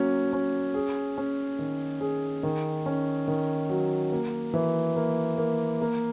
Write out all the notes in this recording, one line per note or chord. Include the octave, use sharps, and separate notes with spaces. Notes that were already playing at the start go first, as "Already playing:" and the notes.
Already playing: F#3 A#3 C#4
C#4
G#4
C#4
D#3
G#4
D#3
C#4
D#3
F#3
A#3
E3
A#3
A#3
A#3